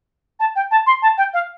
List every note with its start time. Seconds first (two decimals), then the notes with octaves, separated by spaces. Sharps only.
0.40 A5
0.56 G5
0.71 A5
0.87 C6
1.02 A5
1.18 G5
1.34 F5